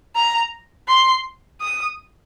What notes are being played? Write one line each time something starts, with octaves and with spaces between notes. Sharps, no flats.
A#5
C6
D#6